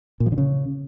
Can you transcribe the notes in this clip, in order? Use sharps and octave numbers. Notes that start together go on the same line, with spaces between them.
A#2
F3
D3
C#3